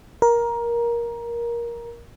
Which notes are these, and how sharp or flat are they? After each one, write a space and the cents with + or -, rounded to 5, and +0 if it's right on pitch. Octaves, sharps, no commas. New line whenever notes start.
A#4 +15